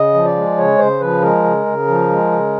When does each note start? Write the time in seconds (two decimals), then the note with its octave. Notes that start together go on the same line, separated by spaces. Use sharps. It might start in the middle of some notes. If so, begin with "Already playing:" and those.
Already playing: C#3 D#5
0.14 F3
0.25 D5
0.36 G#3
0.57 C#3 C#5
0.79 C#3 C5
1.00 F3 B4
1.22 G#3 A#4
1.44 C#3
1.66 C#3
1.88 F3
2.10 G#3
2.32 C#3